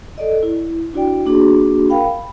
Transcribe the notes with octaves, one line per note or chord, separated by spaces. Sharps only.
A4 D5 D#5
E4
D4 E4 F#4 D5 G5
A#3 D4 F#4 G#4
A#4 F5 G5 B5
B5